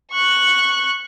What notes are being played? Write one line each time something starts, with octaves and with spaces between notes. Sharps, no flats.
C#6 F#6